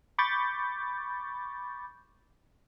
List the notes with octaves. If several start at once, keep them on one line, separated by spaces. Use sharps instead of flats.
B5 C#6 D6 G6 A6